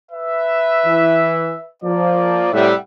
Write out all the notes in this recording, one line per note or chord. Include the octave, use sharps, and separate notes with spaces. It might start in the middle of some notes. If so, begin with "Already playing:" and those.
B4 E5
E3
F3 A#3 D5
A2 C3 G3 E5 F#5